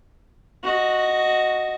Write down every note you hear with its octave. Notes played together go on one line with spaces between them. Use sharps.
F#4 D#5